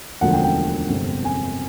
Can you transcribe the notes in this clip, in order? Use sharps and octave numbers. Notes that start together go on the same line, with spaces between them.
E1 D2 D3 F3 F#5
G5
G5
G1 F2 C3
G#5